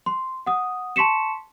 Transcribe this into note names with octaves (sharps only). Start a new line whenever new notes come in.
C6
F#5 D#6
A5 C6 C#6 B6 C#7 E7